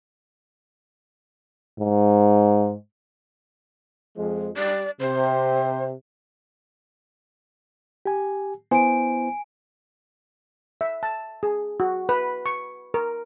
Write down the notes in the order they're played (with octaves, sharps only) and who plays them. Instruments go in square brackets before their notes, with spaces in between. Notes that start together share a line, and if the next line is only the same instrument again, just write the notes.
[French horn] G#2
[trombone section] F2 F3 G#3
[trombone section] G3 [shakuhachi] D5
[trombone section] C3 [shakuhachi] C5
[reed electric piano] G4 G#5
[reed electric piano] B3 E4 C5 [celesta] G#5 D7
[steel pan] E5
A5
G#4
F#4
B4
C#6
A#4